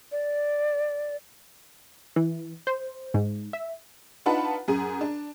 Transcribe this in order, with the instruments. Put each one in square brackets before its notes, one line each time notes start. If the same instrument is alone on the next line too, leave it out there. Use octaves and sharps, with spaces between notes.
[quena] D5
[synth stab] E3
C5
G#2
E5
[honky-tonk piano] D4 D#4 F4 B4 F#5 A5
F#2 G#4 D#7
D4